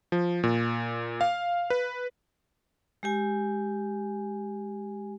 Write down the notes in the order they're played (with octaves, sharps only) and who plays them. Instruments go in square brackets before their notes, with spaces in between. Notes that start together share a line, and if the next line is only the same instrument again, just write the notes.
[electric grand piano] F3
A#2
F5
B4
[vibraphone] G#3 G4 G#5